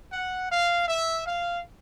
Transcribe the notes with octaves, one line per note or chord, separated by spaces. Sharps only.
F#5
F5
E5
F5